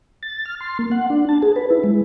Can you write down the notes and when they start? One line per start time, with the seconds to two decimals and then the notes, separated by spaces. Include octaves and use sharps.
0.23 A6
0.45 F6
0.61 C6
0.79 A#3
0.92 F#5
1.10 D4
1.29 A5
1.42 G#4
1.56 B4
1.70 E4
1.84 G#3